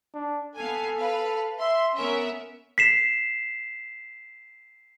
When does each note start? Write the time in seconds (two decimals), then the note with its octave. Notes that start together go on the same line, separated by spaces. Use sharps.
0.14 D4
0.56 B3 A4 F5 G#5
0.98 B4 F5
1.60 E5 C6
1.95 B3 C#4 A#4 E5
2.78 B6 C7 E7